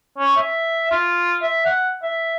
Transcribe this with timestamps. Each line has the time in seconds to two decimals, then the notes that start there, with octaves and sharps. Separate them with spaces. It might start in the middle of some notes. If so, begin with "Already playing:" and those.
0.18 C#4
0.36 E5
0.91 F4
1.42 E5
1.65 F#5
2.03 E5